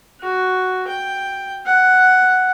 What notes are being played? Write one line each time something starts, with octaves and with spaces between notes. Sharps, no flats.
F#4
G5
F#5